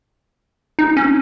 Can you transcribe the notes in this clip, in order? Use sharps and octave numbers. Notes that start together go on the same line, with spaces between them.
D#4
C#4